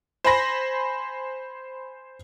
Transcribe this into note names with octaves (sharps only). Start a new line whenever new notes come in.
C5 G#5 B5 A#6